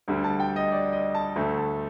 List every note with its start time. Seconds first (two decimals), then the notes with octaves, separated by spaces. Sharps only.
0.08 D2 D3 G3
0.24 A5
0.40 G5
0.56 D#5
0.72 D5
0.93 D#5
1.15 A5
1.36 D2 D3 A3
1.57 A5